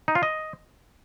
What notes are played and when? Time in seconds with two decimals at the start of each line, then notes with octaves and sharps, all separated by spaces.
0.08 D#4
0.15 F4
0.23 D#5